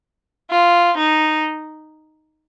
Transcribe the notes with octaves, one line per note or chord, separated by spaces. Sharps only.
F4
D#4